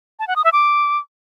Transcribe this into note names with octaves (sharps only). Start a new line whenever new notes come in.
A5
F#5
D#6
E5
D6